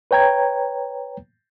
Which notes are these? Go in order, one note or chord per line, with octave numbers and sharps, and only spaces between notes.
B4 C#5 G5 A#5 G#6